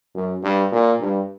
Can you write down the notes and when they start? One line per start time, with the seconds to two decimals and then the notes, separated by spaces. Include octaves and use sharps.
0.15 F#2
0.43 G2
0.72 A#2
1.01 G2